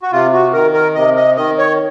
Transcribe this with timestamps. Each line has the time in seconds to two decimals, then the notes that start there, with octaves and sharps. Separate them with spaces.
0.03 F#4
0.12 C3 F4
0.33 F#4
0.53 D#3 A#4
0.74 A#4
0.95 C3 D#5
1.16 D#5
1.36 D#3 D#5
1.58 C#5